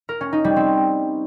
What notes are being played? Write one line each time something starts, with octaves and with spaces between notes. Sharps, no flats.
A#4
C#4
D#4
G3
C4